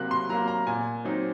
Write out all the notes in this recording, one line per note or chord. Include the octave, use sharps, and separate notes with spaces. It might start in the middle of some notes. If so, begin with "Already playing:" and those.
Already playing: C3 F#3 A#3 F#6
C6
F#3 A#3 A#5
A#5
A#2 G#5
F#3 C4 D#4